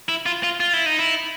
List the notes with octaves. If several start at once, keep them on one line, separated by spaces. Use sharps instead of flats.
E4
F4
F4
F4
E4
D#4
E4